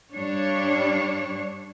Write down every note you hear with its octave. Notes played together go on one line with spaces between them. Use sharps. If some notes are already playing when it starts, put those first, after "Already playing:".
G2 G3 D4 C#5